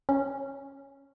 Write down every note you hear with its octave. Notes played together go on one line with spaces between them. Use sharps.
C#4